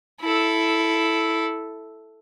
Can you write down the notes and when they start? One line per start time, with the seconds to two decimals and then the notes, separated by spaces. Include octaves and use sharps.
0.21 E4 A4